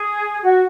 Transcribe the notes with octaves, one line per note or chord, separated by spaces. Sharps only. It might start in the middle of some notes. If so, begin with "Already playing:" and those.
Already playing: G#4
F#4